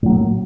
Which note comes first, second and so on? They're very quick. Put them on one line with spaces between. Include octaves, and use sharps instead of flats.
A2 F#3 A#3